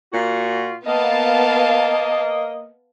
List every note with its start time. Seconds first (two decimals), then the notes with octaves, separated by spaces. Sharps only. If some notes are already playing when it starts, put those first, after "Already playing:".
0.13 A#2 F4 F#4
0.87 A#3 B3 D#5 F5 A5